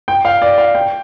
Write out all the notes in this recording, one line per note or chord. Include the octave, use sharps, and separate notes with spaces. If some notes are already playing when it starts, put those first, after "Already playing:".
G5
F5
D5
F5
G5